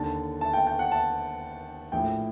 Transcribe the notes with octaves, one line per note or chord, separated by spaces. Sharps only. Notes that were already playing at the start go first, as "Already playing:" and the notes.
Already playing: D#2 D3 A5
A5
G5
G5
F#5
A5
A#1 A2 G5